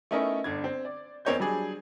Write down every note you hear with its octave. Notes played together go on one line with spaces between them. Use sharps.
A3 B3 C#4 D#4 E4 A#4
G1 D3 G#6
C4
D5
E2 C4 A#4 C#5 D#5 G6
F#3 G3 D4 G#4